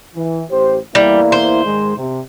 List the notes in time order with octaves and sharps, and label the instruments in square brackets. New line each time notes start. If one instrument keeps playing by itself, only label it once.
[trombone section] E3
A1 G4 C5
[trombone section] E2 A#3 E4 [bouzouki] G3
[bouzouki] C5
[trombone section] G#2 D#3 G#3
C3